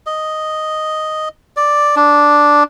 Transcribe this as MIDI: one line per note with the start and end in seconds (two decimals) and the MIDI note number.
0.06 1.29 75
1.57 1.95 74
1.96 2.63 62